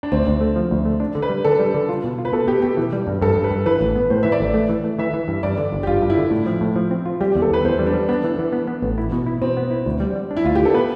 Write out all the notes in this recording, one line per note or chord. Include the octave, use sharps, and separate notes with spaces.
D4
D2 C4
D2
A3
F3
D2
A3
D4
D3
B4
G3
D3 A4
G3
D3
F4
B2
F4
B4
B2 A4
B2 G4
B2 G4
E3
G3
G2
G2 A4
G2
B4
G2
E3 B4
A1
B3
A2 C5
E3 E5
D5
A1
A3
E3
A3
E3 E5
E3
G2
G2 D5
D3
G1
G4
G2 F4
G2
E4
D3
A2
F3
A2
F3
C4
F4
G3 G4
G4
E2
A4
E2 B4
E2 C5
G3
D4
G3
B3 D4
E3
E3
B3
B3
A1
E4
B2
E4
B2 C4
B3
E4
D2
G3
G3
D4
E4
D2 F4
D3 G4
A4
B3 B4